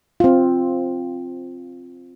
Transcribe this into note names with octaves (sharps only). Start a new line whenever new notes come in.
C4 F4